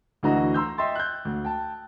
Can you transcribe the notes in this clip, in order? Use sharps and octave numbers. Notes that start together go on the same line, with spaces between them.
D2 D3 E3 F#4 D#5 A#5
A#5 C6 E6 G6
D#5 E5 G5 C6 A6
F#6 G6
D2
G5 A5